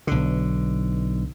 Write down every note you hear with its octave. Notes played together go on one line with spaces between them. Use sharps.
B1 D3